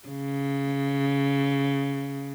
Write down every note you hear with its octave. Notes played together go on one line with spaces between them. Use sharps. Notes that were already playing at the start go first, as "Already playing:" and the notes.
C#3